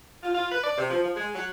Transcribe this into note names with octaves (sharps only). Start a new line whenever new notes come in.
F4
F4
B4
D5
C3
F3
F3
G#3
F#3